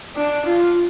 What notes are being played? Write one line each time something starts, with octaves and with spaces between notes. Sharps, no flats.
D4
F4